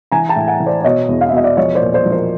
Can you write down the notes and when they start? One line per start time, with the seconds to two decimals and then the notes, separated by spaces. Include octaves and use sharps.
0.12 E3 G#5 A#5
0.29 G5 A5
0.36 A2
0.48 F#5 G#5
0.60 E3
0.66 C5 D5
0.81 D5
0.84 B2 C#5 D#5
1.09 E2
1.21 F5
1.29 E5
1.33 B2 D#5
1.44 D5 E5
1.57 F3 C#5 D#5
1.75 C5 D5
1.81 A#2
1.93 C5 D5
2.05 F3
2.12 A#4 C5